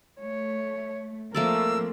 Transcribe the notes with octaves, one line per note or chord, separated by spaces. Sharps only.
A3 C#5
F3 A3 A#3 C4 A#4 D5 E6